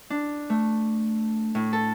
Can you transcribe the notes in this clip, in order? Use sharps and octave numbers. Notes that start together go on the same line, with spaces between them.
D4
A3
A2
A4